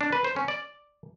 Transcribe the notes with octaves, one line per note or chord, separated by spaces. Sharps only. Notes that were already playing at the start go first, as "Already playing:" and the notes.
D4
B4
C5
C#4
D5